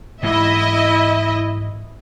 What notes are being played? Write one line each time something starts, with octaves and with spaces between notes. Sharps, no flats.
G#2 E3 E4 D#5 E5